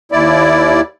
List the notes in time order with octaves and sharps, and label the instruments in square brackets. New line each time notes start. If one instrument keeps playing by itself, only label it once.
[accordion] D#2 E4 D5